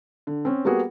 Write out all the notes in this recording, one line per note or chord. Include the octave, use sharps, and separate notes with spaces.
D3
C4 C#4
G3 A#3 B3 F#4 G#4